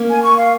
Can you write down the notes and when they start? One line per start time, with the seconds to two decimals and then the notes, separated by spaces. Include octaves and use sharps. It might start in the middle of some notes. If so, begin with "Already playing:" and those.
Already playing: A#3 C#4
0.09 G#5
0.22 C#6
0.38 F5